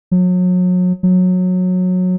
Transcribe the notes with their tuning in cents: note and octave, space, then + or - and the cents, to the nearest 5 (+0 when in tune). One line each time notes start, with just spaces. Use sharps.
F#3 -35
F#3 -20